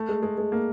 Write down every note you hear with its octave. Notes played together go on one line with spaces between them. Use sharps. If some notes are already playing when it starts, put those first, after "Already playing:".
Already playing: A3
G#3
G#3
G#3
A#3